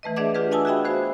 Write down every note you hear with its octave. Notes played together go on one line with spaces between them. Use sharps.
E3 A3 B4 D#5
D4 G#4 D5 E5 F#5 D6
D4 F4 G4 G#4 B4
D#5 F#5 G#5 A5 D#6 E6
F#4 G#4 E5 G5 B5
B3 F#4 G#4 C5 F5